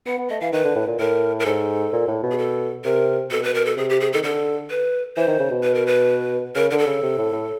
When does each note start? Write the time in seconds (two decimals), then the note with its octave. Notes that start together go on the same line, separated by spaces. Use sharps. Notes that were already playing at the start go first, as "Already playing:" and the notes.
0.06 B3 F#5
0.18 B3
0.29 A3 D#5
0.41 E3 F5
0.53 D#3 B4
0.65 D3
0.76 A2
0.87 A#2
0.99 A2 A#4
1.40 A#4
1.46 G#2 A4
1.92 A#2
2.07 A2
2.23 B2
2.31 G#4
2.38 A4
2.84 C3 A#4
3.31 B2 A4
3.43 B4
3.54 A#4
3.66 A4
3.77 C3 G#4
3.90 G4
4.01 G#4
4.13 D#3 A4
4.23 D3 A4
4.70 B4
5.17 E3 C5
5.27 D#3
5.39 C#3
5.51 B2
5.63 B4
5.75 A#4
5.87 B4
6.55 C#3 A#4
6.71 D3 A#4
6.78 A4
6.87 C#3
7.02 C3
7.18 A2
7.33 A2